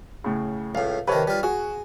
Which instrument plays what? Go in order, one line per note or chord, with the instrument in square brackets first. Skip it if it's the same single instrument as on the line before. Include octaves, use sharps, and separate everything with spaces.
[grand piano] A2 C#3
[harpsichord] C#2 A2 [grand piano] F5
[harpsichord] C3 D#3 [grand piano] B4 C#5 A5
[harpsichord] G3 F4
[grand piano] F#4 [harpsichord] G#4